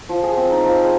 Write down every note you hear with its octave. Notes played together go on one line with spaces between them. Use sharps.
F3
G#4
C4
D#4
F3
G#4